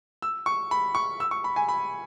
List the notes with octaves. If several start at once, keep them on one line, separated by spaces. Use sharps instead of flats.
E6
C#6
B5
C#6
E6
C#6
B5
G#5
B5